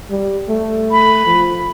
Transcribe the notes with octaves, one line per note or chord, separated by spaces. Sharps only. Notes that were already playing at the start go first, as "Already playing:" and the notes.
G3
A3
B5
F3